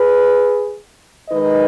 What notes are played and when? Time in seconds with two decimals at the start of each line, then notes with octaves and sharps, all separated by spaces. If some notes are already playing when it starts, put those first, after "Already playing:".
Already playing: G#4 B4
1.29 D#3 G#3 D#4 B4 D#5